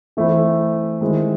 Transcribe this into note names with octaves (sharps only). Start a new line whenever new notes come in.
E3 A3 C4 E4
D#3 G#3 C4 E4